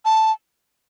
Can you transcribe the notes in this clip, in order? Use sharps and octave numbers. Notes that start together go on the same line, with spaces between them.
A5